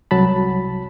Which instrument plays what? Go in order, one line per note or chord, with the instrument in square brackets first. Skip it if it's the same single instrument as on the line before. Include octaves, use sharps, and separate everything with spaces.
[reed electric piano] C2 F#3 A5 B5